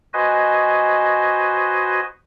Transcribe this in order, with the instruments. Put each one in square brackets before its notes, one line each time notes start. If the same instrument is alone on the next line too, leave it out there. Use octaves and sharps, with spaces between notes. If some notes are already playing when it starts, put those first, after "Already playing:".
[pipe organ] F#4 B4 C5 D#5 G#5